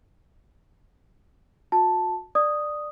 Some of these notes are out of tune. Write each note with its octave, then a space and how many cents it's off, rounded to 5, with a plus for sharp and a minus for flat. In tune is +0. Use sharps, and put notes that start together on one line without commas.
F#4 -35 A5 +0
D5 +15 D#6 +0